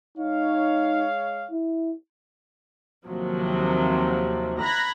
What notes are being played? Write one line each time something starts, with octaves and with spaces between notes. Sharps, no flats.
G#3 D#4 C#5 F5
E4
D#2 C3 F3 F#3
A#5 B5 F#6 G#6 A#6